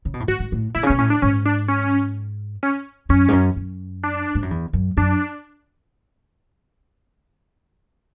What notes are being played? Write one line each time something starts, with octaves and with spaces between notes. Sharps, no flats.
C#3
B2
A2
G#2 F#4
G#2
A2
B2 E4
C#3
C#4
B2
A2 C#4
D4
G#2 C#4
D4
C#4
C#4
F#2 C#4
G#2
F#2
F#2
D4
G#2
F#2
E2
F#2
F#2 D4